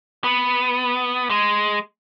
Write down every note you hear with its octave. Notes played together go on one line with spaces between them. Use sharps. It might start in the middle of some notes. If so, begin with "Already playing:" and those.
B3
G#3